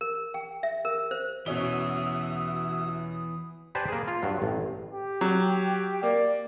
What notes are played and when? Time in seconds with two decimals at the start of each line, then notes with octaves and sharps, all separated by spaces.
0.01 A#4
0.34 G5
0.63 E5
0.85 A#4
1.11 C5
1.46 B2 E3 B3 C#4 F#4 E5 D#6 G7
3.75 G4 B4 C5 D5 G#5 A5
3.88 A#3 G#4
4.08 F4
4.22 G2 F#3
4.42 A1
4.91 G4
5.21 F#3
6.03 A#3 D5